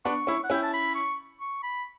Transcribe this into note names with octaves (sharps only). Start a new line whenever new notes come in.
B3 D4 C#6
C#4 E4
F#5
C#4 E4 G5
A5
B5
C#6
C#6
B5